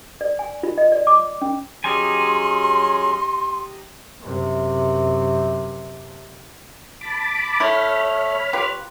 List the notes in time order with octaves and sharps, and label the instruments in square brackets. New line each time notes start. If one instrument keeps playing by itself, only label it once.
[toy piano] D5
G#5
F4
D#5
D5
D6
C#4
[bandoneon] F#3 C#4 G#4 [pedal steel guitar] D#4 G4 G#5 [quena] C6
[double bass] F#2 C3
[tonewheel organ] A5 B5 D6
[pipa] A3 E4 [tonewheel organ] C#5 B5 F6
[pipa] F4 G4 B4